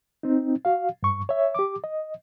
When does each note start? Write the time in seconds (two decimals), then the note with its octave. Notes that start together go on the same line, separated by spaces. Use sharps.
0.23 C4 D#4
0.65 F#4 F5
1.03 G2 C#6
1.29 C#5 E5
1.55 G4 D6
1.84 D#5